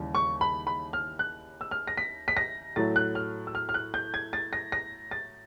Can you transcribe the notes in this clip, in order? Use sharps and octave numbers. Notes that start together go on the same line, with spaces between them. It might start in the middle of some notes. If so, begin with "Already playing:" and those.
Already playing: D#2 C#3 E3 G3
C#6
B5
B5
F6
F#6
E6
F6
A#6
B6
B6
A#6
A2 F#3 A3 A6
F#6
F6
E6
F6
F6
F#6
G6
G#6
A6
A#6
A#6
A6